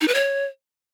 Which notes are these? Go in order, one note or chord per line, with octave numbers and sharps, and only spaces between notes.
D#4
B4
C#5